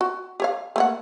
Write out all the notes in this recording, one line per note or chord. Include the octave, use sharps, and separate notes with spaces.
F#4
G4 C#5 F5
A3 A#3 F#5